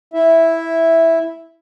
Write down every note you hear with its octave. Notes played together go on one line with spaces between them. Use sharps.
E4 E5